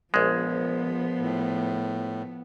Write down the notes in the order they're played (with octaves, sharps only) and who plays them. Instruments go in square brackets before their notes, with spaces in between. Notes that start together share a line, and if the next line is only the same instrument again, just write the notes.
[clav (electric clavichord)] A#1 G#3 [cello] F3 B3
[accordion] A2